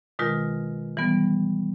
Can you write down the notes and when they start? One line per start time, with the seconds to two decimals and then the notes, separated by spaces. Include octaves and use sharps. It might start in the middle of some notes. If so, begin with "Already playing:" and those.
0.19 B2 D#3 G#3 F4 A#4
0.97 E3 G3 B3